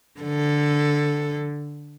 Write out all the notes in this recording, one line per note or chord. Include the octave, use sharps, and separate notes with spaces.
D3 A4